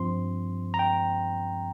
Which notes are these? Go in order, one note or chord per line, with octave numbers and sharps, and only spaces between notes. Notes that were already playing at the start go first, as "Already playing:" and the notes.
Already playing: G2 F3 C4 C6
A#5
G5